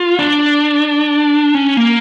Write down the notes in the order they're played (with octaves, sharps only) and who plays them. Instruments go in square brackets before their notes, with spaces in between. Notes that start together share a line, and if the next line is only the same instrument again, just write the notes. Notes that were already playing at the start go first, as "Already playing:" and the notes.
Already playing: [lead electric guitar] F4
D4
C#4
A#3